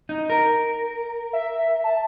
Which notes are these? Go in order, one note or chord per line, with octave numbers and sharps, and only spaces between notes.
D#4
A#4
E5
A5